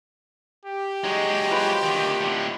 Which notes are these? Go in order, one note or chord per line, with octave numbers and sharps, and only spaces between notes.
G4
F#3 G#3 D#4
F4 B4 C5
D2 D#3
A2 D3